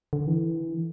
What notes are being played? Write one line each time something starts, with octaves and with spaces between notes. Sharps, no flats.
D3
E3